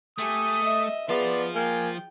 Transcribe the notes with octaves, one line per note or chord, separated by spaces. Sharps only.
A3 G4 G#5 D#6
D#5 E5
F3 B3 F4 G#4 D5
A#3 G5 G#5